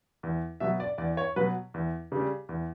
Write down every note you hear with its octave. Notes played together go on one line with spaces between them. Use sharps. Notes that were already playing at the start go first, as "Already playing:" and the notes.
E2
B2 F#3 E5
D5
E2 D5
C#5
B2 F#3 B4
E2
C#3 G3
E2